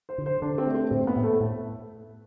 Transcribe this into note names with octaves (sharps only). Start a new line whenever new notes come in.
C5
D3
C5
D3 D4
C4
A3
C4
A2 C4
B3
A2
A3
A2